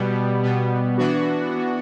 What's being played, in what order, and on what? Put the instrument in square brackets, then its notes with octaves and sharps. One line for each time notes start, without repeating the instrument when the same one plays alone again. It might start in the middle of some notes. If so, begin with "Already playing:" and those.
Already playing: [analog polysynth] B2 G3 B3
B2 G3 B3
E3 B3 D4 F#4
E3 B3